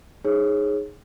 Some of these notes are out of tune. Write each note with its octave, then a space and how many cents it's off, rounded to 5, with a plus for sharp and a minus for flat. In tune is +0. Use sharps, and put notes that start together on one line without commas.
D#4 +0 G#4 +0 C#5 -30